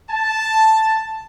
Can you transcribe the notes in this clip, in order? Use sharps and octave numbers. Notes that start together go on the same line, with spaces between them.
A5